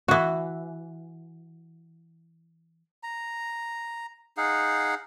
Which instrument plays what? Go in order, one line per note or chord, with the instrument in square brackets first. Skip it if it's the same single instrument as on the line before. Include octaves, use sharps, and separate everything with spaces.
[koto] E3 F#4
[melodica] A#5
D#4 G#4 F5 F#5